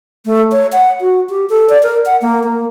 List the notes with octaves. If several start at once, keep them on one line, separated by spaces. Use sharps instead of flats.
A3
C#5
F#5
F#4
G4
A4
D5
A#4
F#5
A#3
A#3